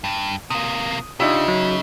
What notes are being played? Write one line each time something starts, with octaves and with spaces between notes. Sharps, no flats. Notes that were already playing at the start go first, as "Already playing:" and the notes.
G2
C3 A#3 D#6
C#3 D4 D#4 F4 G4 E5
F#3